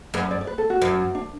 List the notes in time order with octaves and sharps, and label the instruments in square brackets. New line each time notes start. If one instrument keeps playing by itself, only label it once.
[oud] F#2 [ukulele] B4
[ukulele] D5
D5
B4
A4
F#4
[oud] F#2
[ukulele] D4